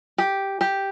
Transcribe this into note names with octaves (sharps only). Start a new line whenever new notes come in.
G4
G4